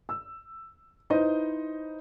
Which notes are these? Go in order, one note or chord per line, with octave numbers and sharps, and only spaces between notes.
E6
D#4 E4 B4 C5 D#5